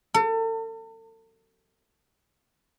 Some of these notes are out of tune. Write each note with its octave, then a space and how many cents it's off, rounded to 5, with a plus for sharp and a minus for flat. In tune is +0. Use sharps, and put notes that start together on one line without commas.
A4 +40